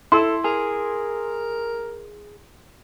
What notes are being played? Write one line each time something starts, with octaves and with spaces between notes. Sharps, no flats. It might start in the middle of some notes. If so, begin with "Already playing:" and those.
E4 A4 C6
G#4 A#4